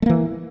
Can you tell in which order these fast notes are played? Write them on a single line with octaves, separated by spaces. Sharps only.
A3 A#3 E3